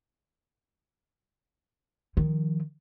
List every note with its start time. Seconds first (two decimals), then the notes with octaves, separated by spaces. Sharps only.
2.17 D#3 F3